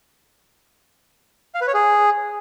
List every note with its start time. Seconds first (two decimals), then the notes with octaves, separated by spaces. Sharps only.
1.55 F5
1.61 B4
1.68 C#5
1.74 G#4